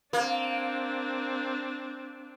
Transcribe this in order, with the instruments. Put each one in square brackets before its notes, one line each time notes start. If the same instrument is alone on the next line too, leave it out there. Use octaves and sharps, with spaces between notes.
[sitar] A#3 [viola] C4 D4